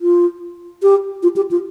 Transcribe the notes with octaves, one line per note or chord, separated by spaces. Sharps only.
F4
G4
F4
G4
F4